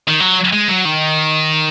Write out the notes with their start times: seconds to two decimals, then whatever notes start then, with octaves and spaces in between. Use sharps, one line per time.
0.08 D#3
0.20 F#3
0.53 G#3
0.68 F#3
0.85 D#3